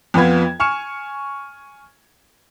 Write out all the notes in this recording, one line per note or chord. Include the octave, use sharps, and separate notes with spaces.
F2 B3 F4 B4 G#6
G#5 C#6 F6 C#7 E7